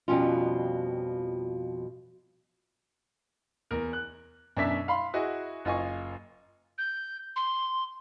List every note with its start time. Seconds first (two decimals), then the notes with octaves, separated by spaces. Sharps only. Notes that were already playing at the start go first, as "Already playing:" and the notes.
0.08 F2 B2 F3 G3 C#4 F4
3.71 E2 A#4
3.93 F#6
4.57 F#2 B2 D4 E5 B6
4.88 F5 B5 C6
5.14 E4 F#4 G#4 D#5
5.65 F#1 F4 D#5 G#5 C#6
6.78 G6
7.36 C6